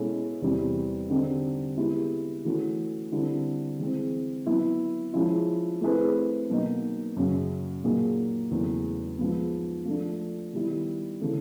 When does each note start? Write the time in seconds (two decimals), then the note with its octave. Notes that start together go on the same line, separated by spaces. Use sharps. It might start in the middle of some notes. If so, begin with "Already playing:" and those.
Already playing: B2 G#3 C#4 E4 A4
0.42 E2 C3 E3 G3
1.10 D3 G3 C4 D#4 G4
1.77 G#3 B3 E4 G4
2.45 E3 A3 C#4 F#4
3.12 D3 G3 C4 E4
3.79 E3 G#3 C4
4.46 F#3 B3 E4
5.13 F3 G#3 C#4 E4
5.81 A3 C4 E4 G#4 B4
6.49 B2 F#3 A#3 D#4
7.16 F#2 C#3 F#3
7.83 A#2 F#3 A#3 D#4 G#4
8.51 E2 C#3 F#3 A3
9.19 G#2 F3 G#3 B3
9.85 F3 A3 D4
10.53 D#3 G3 B3 E4
11.20 C#3 E3 A3 C4